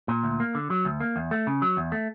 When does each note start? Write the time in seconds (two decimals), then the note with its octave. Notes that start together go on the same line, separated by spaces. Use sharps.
0.08 A#2
0.24 D2
0.40 A#3
0.55 D3
0.70 F#3
0.85 D2
1.00 A#3
1.16 E2
1.31 A3
1.47 C#3
1.62 F#3
1.77 E2
1.92 A3